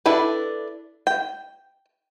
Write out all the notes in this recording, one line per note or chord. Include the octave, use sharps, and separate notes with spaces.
D4 E4 A4 B4
G5